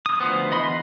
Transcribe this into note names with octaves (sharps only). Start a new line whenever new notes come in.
D#6
D2 F3 B3 C5
E2 D#5 B5 C6